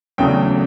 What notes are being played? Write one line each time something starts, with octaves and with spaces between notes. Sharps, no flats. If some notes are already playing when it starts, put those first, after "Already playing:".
E2 C#3 F#3 A3 D4 G5